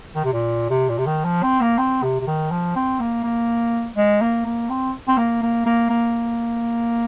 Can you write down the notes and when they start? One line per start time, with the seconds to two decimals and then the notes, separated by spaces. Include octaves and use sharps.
0.15 D#3
0.24 C3
0.33 A#2
0.70 C3
0.89 A#2
0.98 C3
1.06 D#3
1.24 F3
1.42 C4
1.61 A#3
1.78 C4
2.02 C3
2.20 C3
2.27 D#3
2.51 F3
2.75 C4
3.00 A#3
3.23 A#3
3.96 G#3
4.21 A#3
4.46 A#3
4.70 C4
5.08 C4
5.17 A#3
5.42 A#3
5.66 A#3
5.90 A#3